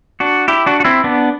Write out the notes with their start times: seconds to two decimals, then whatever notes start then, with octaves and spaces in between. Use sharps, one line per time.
0.20 D4 F#4
0.48 E4 G4
0.66 D4 F#4
0.80 F#4
0.85 C4 E4
1.04 B3 D4